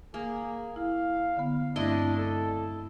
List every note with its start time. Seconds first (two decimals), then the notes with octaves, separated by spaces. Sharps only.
0.14 A#3 G#4
0.76 E4 F5
1.37 D3 B3
1.76 G2 A3 C4 D4 E4 D#5 C6
2.18 A4